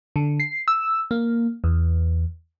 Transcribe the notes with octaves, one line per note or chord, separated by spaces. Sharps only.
D3
C7
E6
A#3
E2